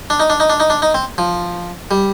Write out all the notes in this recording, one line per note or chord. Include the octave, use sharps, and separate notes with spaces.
D4
D#4
D4
D#4
D4
D#4
D4
D#4
C4
F3
G3